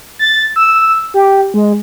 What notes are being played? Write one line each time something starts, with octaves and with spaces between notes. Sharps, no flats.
A6
E6
G4
G#3